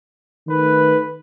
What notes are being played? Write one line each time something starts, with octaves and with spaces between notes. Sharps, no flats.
D#3 A3 B4